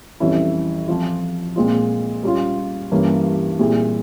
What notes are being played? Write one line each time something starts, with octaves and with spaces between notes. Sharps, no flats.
F2 E3 G3 C#4 E4
F3 C4 F4
A#2 G#3 C4 F4
G3 C#4 F4
G2 E3 A#3 C#4
A#2 G3 C4 E4 G#4